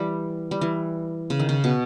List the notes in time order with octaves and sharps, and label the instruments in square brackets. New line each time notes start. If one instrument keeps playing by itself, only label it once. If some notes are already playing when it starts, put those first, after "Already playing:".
Already playing: [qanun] E3 G3
G3
E3
C#3
D#3
C#3
B2